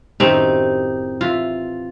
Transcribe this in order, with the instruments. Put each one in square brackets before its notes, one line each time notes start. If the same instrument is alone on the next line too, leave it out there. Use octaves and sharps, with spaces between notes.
[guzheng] F#2 A2 D#3 [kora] C4 D#4 [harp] G4
[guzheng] E3 [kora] F4